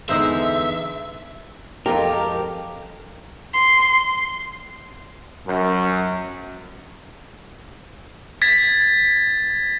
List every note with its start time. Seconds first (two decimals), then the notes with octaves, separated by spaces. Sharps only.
0.09 E2 D3 G#3 D#4 C5 E5 E6
1.86 F2 G#3 F4 G4 A#4
3.53 C6
5.48 F#2
8.42 G#6 A6 B6